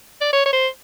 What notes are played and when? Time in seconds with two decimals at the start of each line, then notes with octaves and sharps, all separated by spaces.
0.21 D5
0.33 C#5
0.46 C#5
0.53 C5